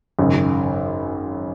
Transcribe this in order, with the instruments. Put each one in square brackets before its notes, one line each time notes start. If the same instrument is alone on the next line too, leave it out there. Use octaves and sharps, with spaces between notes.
[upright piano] G#1 F#2 C#3